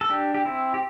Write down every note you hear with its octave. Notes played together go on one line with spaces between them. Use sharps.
A4
D4 G4
G4
C4 E4
G4